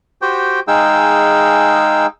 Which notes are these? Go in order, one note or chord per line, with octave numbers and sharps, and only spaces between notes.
F#4 G4 C5 G5
G#3 D#4 G#4 F5 G5 E6